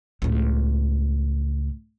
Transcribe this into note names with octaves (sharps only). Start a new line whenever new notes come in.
C#2 A2